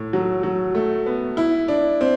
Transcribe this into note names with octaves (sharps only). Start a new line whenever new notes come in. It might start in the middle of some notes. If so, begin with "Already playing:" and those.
Already playing: A2
F#3
F#3
A3
B3
E4
D4
C4